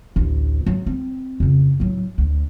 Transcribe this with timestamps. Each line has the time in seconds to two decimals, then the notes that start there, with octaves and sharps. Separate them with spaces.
0.16 A1 D2
0.66 F#3
0.86 C4
1.40 F2 C#3
1.80 A2 F#3
2.18 D2